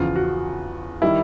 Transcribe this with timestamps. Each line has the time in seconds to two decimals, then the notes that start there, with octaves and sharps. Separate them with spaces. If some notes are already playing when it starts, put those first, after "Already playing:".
Already playing: E2 C#3 F3 F4
0.16 F#4
1.02 D#3 G3 E4